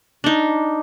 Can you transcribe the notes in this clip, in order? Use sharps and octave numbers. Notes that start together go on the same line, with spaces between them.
D4 D#4